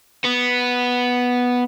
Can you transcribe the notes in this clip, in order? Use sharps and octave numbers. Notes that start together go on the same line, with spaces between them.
B3